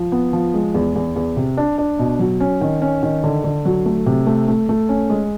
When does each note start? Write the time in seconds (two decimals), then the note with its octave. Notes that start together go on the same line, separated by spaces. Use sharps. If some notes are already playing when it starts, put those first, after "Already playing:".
Already playing: F3
0.12 B3
0.33 F3
0.54 G#3
0.74 E2
0.96 E2
1.16 E2
1.37 C3
1.57 D4
1.78 D4
1.99 B2
2.19 F#3
2.40 C#4
2.61 D#3
2.82 C#4
3.03 D#3
3.24 D3
3.44 D3
3.65 F#3
3.86 A3
4.06 C3
4.27 A3
4.48 A3
4.69 A3
4.89 C#4
5.10 G#3